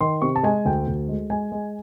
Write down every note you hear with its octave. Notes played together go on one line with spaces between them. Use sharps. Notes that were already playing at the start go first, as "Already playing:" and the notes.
D#3 C6
C3 C#6
A5
G#3 G#5
D2 G5
D2
G#3
G#3 G#5
G#3